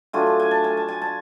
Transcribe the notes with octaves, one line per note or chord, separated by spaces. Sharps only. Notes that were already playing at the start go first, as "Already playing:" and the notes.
F#3 A3 D4 F4 G#5
A5
G#5
A5
G#5
A5
G#5
A5